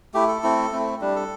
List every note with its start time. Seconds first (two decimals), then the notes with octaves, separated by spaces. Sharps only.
0.14 A3 E4 G4
0.28 A4
0.43 A3 C4 E4
0.72 A3 C4 E4
1.01 G3 D4
1.16 A4